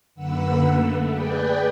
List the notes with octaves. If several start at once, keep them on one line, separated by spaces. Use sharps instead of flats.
F#2 D3 A#3 B4 F#5 E6
A3
G#4 B4 D5 G5